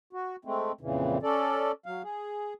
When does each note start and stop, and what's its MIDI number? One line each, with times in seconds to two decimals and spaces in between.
0.13 0.36 66
0.45 0.72 56
0.45 0.72 57
0.45 0.72 60
0.81 1.18 41
0.81 1.18 46
0.81 1.18 49
0.81 1.18 52
1.23 1.72 61
1.23 1.72 69
1.23 1.72 74
1.86 2.02 54
1.86 2.02 77
2.03 2.54 68